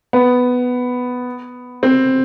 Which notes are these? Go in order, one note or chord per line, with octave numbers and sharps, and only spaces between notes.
B3
C4